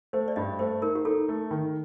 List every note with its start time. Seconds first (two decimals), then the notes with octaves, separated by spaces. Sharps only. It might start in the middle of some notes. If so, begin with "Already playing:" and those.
0.13 A3 C5
0.28 D5
0.36 G2 D#5
0.59 A3 C5
0.82 D#4 A#4
0.95 G4
1.05 D#4 A4
1.28 A3
1.51 D#3